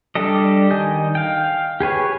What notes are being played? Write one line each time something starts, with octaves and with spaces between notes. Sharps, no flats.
G3 D4 G4 A4 D#5
D#3 D#5 G#5 D#6 G6
F5 G5
G4 G#4 B4 C#5